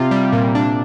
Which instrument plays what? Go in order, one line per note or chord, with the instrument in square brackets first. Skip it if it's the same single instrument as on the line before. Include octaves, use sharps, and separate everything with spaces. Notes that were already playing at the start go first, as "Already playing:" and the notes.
Already playing: [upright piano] C3 [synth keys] F4
[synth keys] G3
A#2
D4